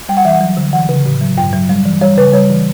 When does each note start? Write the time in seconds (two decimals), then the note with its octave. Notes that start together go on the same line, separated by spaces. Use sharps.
0.09 G3 G5
0.17 F#5
0.25 E3 E5
0.33 F#5
0.41 F#3
0.57 D3
0.73 E3 F#5
0.89 C#3
1.06 A2
1.21 F#3
1.37 G2 G5
1.53 F#3
1.69 G3
1.85 E3
2.01 G3 C#5
2.17 C#3 B4
2.33 G3 C#5
2.50 E3